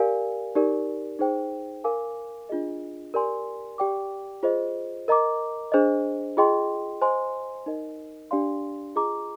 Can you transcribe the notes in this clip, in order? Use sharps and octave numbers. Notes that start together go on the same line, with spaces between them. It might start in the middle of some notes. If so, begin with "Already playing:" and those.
Already playing: G4 A#4 D5 F5 G#5
D#4 G4 A#4 D5
D#4 G#4 C5 G5
A#4 F5 G#5 D6
D4 F4 G#4 D#5
G4 A#4 D5 G#5 C6
G4 D5 G5 D6
F4 G#4 C5 D#5
A#4 D#5 A#5 D6
D4 G#4 C5 D#5
F4 G#4 D#5 G5 C6
C5 D#5 G#5 C6
D#4 A#4 D#5
D4 G4 D5 F5 C6
F4 G#4 D#5 A#5 D6